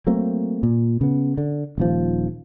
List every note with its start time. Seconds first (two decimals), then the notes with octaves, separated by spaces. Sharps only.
0.07 F#3 A3 A#3 C4
0.63 A#2
1.01 C#3 B3
1.38 D3
1.78 D#1 D#2 F3